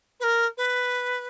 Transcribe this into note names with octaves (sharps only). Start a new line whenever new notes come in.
B4
A#4
B4